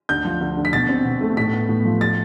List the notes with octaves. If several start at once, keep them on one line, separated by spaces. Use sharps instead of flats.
D2 G6
F3
D2
D3
B6
B2 A6
C4
B2
A3
A2 B6
B3
A2
F3
A6